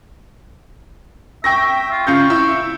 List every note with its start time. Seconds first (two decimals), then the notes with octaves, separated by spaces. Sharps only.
1.44 E5 G5 C#6 A#6
1.91 F4
2.07 C#3 F4 C#6 G6
2.30 E4 E6